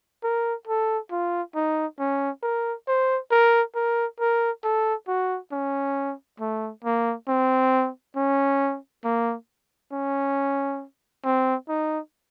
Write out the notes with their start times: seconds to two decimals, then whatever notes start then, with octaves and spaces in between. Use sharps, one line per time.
0.23 A#4
0.67 A4
1.11 F4
1.55 D#4
1.99 C#4
2.43 A#4
2.88 C5
3.31 A#4
3.75 A#4
4.20 A#4
4.64 A4
5.08 F#4
5.52 C#4
6.40 A3
6.84 A#3
7.28 C4
8.16 C#4
9.04 A#3
9.93 C#4
11.25 C4
11.68 D#4